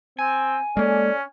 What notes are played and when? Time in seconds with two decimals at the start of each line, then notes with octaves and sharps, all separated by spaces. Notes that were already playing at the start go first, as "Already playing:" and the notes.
0.19 C4 G#5
0.77 G#3 A#3 C#4 A4 D5